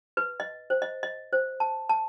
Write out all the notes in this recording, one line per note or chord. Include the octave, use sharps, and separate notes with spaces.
B4
D#5
C5
D#5
D#5
C5
A5
A5